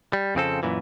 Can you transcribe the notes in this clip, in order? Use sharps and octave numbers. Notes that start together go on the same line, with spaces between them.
G3
F2 C#3 C4 A4
F#2 A#2 E3